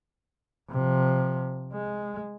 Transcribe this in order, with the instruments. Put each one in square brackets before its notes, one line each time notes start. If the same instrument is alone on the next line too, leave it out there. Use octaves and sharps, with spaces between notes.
[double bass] C3 F3
G#3